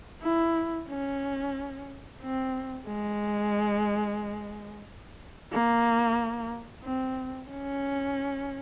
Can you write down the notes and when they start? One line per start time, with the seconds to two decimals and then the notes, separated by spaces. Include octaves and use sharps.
0.23 E4
0.89 C#4
2.21 C4
2.87 G#3
5.52 A#3
6.83 C4
7.50 C#4